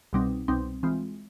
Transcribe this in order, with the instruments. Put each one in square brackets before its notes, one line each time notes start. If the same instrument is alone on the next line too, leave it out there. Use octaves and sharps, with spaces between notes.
[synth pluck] C2 B2 G3 C4 D#4
C2 B2 G3 C4 D#4
E3 G#3 C4 F4